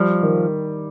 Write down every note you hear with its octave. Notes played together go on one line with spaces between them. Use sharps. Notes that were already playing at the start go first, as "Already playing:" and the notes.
Already playing: F3 G3
D#3